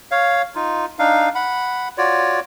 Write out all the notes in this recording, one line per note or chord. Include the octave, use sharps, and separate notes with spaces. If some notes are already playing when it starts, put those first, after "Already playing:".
C#5 F5
D#4 F4
D4 D#4 F5
F#5 B5
F4 F#4 C#5 D5